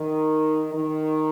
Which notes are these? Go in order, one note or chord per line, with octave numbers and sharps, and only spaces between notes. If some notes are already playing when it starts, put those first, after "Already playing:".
Already playing: D#3
D#3